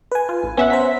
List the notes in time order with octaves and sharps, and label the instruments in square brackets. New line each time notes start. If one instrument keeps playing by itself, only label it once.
[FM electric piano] B4 G#5
[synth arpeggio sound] F4
A1
[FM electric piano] B3 [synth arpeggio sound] C#4 E5 F#5
[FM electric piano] C5 A#5 B6